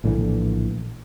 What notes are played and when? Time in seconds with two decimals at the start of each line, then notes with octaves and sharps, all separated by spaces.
0.04 A#1 A2 D3 E3